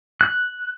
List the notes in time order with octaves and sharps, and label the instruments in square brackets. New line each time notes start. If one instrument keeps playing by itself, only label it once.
[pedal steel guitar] F#6